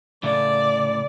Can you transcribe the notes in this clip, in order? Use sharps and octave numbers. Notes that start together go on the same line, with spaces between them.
A2 C#3 A3 D5